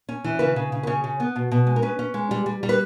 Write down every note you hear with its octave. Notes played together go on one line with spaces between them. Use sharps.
C#4
E3
C#3 B4
C#3
C#3
B4
C#3 C#5
C#3
B3
B2
B2
G#3
A#4
C#4 B4
C#4
G#3
G3
G3
G3
B4